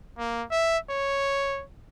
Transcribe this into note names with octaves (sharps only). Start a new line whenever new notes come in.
A#3
E5
C#5